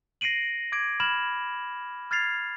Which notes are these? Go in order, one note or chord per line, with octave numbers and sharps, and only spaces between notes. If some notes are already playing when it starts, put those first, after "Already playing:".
A#6 C7 D7 D#7 F#7
D6 G#6 D7
B5 F6 G#6 E7 F#7
F6 G#6 A6 C7 F7